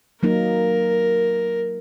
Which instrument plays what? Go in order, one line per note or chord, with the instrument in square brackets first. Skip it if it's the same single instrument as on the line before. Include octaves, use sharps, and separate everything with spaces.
[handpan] F#3 A#3 D#4 [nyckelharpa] A#4